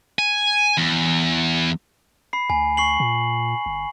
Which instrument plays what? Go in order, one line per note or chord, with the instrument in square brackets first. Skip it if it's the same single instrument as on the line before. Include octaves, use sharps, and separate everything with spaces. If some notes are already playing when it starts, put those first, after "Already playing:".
[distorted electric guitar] G#5
E2
[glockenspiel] B5 C7
[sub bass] D2 [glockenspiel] G#5
[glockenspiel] C#6 C7 F#7
[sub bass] A#2
G1